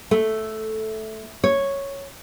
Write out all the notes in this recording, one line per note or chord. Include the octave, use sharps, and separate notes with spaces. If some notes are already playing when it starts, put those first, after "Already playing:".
A3
C#5